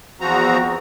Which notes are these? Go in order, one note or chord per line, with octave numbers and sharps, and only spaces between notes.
E2 F3 C4 F#4 A#5